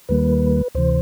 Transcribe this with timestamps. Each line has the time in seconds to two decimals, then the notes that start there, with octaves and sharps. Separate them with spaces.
0.09 D#2 D#3 G3 A#3 B4
0.75 D2 C3 E3 C5